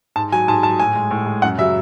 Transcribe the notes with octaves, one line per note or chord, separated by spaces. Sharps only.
G#2 A5
F#3 G#5
G#2 A5
F#3 A5
A2 G#5
G#3
A2
G#3
F#2 F#5
C#3 F#3 E5